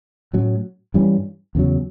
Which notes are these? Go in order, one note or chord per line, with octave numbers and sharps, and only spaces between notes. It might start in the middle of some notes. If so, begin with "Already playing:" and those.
A2 F#3 C#4
G2 E3 G3 C#4
E2 C#3 F#3